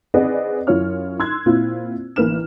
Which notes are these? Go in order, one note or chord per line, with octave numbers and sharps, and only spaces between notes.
C4 G#4 B4 D5 D#5 F#5
F#2 E4 F4 C#5 F6
C6 E6 F#6 G#6
A#2 C4 E4 F4
A1 E3 A#3 B4 F6 E7